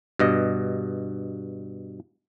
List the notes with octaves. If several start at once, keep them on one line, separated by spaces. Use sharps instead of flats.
G2 B2 D#5